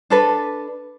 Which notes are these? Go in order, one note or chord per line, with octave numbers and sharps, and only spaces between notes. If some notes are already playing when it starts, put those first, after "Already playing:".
D4 A4 B4